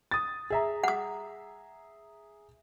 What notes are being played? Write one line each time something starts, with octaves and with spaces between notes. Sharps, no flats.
D#6 A6
G#4 E5 A#5
F#5 D#6